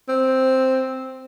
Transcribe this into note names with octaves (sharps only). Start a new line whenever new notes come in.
C4